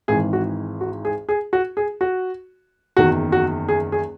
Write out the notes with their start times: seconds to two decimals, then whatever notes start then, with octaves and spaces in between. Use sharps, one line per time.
0.08 G#1 G#2 E3 G#4
0.33 F#4
0.81 F#4
1.05 G#4
1.29 G#4
1.53 F#4
1.77 G#4
2.01 F#4
2.97 F#1 E2 D#3 F#4
3.32 F#4
3.69 G#4
3.92 G#4